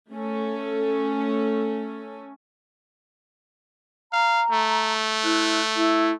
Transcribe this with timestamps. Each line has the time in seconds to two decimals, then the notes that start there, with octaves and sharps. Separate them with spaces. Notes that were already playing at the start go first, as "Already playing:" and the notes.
0.11 A3 C#4 A4
4.13 F5 A#5
4.51 A3
5.23 E4 C5 F#6
5.76 E4